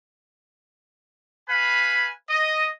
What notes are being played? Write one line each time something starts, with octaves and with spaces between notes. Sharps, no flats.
B4 F5 G#5 B5
D#5